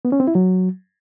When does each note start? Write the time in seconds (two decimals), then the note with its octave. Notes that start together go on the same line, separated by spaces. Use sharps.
0.05 B3
0.12 C#4
0.20 C4
0.27 E4
0.35 F#3